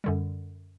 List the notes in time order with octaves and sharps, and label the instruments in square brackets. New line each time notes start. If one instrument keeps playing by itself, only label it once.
[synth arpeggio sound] F#2 D3 G3